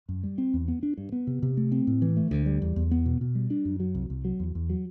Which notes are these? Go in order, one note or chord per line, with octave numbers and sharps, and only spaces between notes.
F#2
G3
C4
E2
B3
D4
G2
B3
C3
C3
A3
C4
A2
E3
A3
D2
G3
E2
E2
B3
B2
B2
G3
D4
F#2
F#3
C2
C2
F#3
E2
E2
F#3